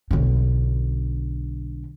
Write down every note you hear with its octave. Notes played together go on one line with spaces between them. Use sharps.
B1 D3